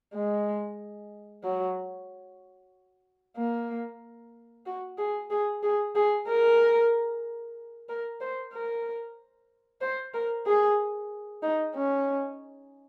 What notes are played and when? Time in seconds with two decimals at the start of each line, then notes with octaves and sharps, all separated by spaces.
0.14 G#3
1.44 F#3
3.37 A#3
4.66 F#4
4.98 G#4
5.30 G#4
5.63 G#4
5.95 G#4
6.27 A#4
7.89 A#4
8.20 C5
8.54 A#4
9.81 C5
10.14 A#4
10.46 G#4
11.43 D#4
11.75 C#4